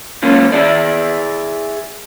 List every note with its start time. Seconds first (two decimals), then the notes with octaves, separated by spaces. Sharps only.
0.23 A#3 C#4 F4
0.52 E4 G#4 D5